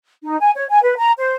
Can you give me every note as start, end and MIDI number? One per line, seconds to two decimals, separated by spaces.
0.24 0.38 63
0.40 0.51 80
0.55 0.65 73
0.69 0.81 80
0.82 0.94 71
0.97 1.12 82
1.18 1.36 72